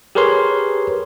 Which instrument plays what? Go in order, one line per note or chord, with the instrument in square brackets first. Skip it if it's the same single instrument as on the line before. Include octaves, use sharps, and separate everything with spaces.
[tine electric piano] G4 G#4 A#4 B4 C#5 C6